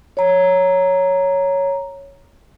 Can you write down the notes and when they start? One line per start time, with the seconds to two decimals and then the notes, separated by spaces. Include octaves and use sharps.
0.17 C#5 A#5